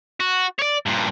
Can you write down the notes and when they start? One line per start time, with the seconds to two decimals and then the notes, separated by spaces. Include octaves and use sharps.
0.20 F#4
0.59 C#5 D5
0.86 G2 A#2